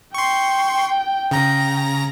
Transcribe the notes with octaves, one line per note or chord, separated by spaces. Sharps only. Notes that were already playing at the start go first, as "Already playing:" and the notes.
G5 C6 C#6
C#3 A#5 A#6